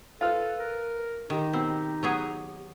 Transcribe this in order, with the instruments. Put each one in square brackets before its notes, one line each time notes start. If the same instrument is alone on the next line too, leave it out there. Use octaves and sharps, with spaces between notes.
[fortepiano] F4 F6 [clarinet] A4 [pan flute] B4
[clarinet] A#4
[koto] D#3 [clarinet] D#4 [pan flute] G4
[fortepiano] B2 [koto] C4
[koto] F#3 B3 G#4